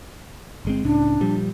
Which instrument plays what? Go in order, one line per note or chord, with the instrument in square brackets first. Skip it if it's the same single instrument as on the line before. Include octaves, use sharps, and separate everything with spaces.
[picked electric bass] G1 G#3 C4
[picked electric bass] C#2 A2 C#4 [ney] D4
[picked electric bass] A#2 F3 G3